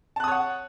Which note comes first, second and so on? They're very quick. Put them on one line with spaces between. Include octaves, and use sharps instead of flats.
A5 F#6 D#6 C#5 F#5